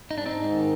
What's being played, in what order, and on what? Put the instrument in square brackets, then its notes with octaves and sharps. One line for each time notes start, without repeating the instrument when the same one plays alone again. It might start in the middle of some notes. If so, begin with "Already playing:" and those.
[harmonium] G#2 [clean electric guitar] D#4
[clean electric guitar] D4
[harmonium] G#2 [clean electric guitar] C4 D#4
[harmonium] D#3